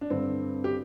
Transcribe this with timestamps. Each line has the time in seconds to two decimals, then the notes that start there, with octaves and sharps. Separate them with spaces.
0.01 D4
0.10 G2 D3 C4
0.64 G4